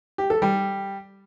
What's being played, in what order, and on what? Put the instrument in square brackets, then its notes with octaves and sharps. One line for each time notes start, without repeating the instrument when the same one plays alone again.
[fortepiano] G4
A4
G3